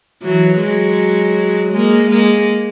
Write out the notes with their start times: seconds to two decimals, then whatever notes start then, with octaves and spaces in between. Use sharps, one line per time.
0.22 E3 F#3
0.59 F#3 G#3
1.72 G#3 A#3
2.09 G#3 A#3